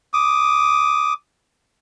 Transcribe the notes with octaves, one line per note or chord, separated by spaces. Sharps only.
D6 D#6